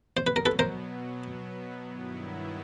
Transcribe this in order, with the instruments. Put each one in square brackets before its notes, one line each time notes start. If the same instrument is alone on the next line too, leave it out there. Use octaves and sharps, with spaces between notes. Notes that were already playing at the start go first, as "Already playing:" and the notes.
[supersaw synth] B2 F#3 B3 [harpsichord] C5
[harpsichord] B4
A#4
A4 B4
A#4 C5
[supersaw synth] G2 D#3 F#3 B3 E4